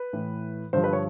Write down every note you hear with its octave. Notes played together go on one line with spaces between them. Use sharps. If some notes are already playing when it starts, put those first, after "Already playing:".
Already playing: B4
A2 E3
G2 D3 F3 C5
B4
C#5